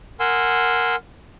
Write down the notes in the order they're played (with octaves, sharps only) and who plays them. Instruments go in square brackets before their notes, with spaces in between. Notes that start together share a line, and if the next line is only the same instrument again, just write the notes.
[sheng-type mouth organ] A#4 F#5 G#5 C6 E6